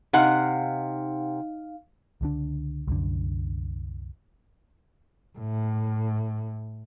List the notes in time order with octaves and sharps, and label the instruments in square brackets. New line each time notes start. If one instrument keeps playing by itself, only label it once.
[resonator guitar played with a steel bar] C3 F#5 [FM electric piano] D#4 F5
[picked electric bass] C#2 D3 D4
C2 F#2 D3
[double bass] A2